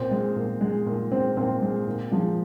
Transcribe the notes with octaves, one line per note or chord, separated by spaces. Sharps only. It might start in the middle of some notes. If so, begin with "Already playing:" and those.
Already playing: A#2 C4
G#3
A#2
G#3
A#2
G#3 C4
A#2 C4
G#3
A#2
F3 G#3